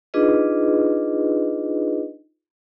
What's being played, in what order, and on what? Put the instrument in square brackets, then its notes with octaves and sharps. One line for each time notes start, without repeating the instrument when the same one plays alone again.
[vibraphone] D4 D#4 F4 G#4 B4 D#5